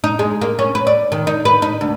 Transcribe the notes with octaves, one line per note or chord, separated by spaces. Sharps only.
D#4
G#3
A#3
C#4
B4
D5
D#3
D#4
B4
D#4
D2